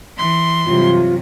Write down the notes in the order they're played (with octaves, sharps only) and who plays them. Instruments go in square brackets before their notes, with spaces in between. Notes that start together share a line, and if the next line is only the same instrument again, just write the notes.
[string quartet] E3 C6
[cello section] G2 C3 F#3 [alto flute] F4